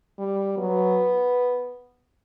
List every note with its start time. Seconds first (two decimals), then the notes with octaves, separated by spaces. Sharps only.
0.19 G3
0.58 F#3 B3